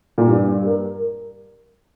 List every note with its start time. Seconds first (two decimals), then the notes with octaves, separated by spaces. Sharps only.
0.18 A#2
0.28 G2 G3
0.64 A#4